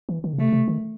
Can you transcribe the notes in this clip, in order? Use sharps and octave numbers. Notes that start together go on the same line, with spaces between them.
E3
D#3
C#3
C3 A3
C3
D#3